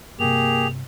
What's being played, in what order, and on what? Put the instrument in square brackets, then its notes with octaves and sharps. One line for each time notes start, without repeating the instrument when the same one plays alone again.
[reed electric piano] G2 C3 [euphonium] A#3 [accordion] G4 G#4 [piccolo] F7